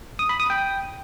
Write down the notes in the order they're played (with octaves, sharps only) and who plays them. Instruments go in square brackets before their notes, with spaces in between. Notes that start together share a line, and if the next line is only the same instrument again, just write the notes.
[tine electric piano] D#6
B5
D#6
G5